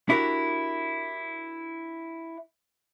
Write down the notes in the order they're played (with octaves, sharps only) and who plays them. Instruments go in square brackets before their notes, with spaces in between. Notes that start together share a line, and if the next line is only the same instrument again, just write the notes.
[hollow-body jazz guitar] D4 E4 F#4 G4 A#4